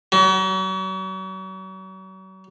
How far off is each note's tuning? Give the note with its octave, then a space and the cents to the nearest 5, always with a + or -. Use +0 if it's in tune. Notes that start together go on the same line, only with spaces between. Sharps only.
F#3 +40